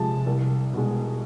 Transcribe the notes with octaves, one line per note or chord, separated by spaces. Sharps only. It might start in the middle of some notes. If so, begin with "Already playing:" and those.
Already playing: C3 F3 G#3 A5
C2
B2 G#3